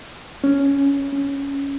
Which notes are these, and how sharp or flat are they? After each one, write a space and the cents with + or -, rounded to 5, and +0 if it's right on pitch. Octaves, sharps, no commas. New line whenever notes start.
C#4 +5
C#4 +5